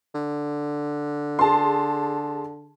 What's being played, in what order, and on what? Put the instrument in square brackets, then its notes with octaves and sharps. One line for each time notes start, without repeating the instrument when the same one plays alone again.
[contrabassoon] D3
[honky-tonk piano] G#4 A5 C6